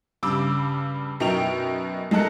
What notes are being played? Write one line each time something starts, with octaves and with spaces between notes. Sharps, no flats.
G2 C#3 G3 D6 E6
F#2 B2 D#4 A#4 G5 F7
G#3 D#4 A4 A#4 F#6 C#7